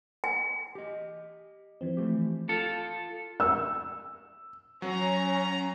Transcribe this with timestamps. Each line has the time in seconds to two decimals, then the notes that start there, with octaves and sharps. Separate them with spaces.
0.24 G#5
0.75 G4 D#5
1.81 E3 F3 C4
1.97 A3 G4
2.49 F4 A4
3.40 E6
4.82 F#3 C#4 A#5